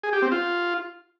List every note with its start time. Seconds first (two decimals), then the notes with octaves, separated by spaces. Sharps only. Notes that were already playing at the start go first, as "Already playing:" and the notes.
0.03 G#4
0.13 G4
0.22 C4
0.32 F4